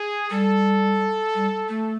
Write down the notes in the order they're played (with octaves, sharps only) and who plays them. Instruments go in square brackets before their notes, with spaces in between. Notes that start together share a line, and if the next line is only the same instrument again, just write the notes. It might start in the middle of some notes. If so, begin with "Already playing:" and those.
Already playing: [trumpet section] G#4
[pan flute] G3 [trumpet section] A4
[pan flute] G3
A3